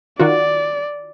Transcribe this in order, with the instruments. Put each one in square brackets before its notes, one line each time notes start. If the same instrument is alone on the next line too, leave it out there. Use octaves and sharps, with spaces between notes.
[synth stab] D#3 F4 F#4 [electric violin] D5